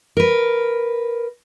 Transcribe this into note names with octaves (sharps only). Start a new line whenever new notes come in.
A#4 B4